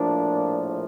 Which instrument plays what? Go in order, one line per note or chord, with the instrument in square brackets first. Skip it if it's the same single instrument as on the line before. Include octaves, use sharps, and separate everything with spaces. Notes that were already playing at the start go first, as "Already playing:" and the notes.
Already playing: [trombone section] A#1 A2 F3 A#3 D4